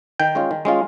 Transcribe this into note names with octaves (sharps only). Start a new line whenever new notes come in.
D#3 G5
G#3 C#4 F4
D#3
G#3 C#4 F4